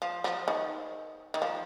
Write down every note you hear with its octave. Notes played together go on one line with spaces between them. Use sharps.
F3
F3
D#3
D#3
F3